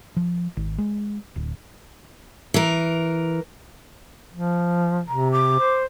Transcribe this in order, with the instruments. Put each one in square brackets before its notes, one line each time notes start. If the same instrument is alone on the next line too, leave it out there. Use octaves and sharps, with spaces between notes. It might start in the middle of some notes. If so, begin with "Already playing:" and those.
[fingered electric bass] F3
G#1
G#3
D1
[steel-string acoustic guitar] E3 A#4
[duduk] F3
[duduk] C3 [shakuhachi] A#5
[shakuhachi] D6
[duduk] C5